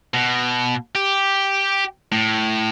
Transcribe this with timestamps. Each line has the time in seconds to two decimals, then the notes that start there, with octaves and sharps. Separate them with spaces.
0.14 B2
0.95 G4
2.12 A2